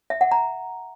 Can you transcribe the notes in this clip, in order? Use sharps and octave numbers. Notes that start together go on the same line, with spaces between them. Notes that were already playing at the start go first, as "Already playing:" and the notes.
E5
F#5
A#5